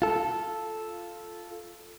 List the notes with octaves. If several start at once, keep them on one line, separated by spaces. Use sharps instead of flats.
F4 A4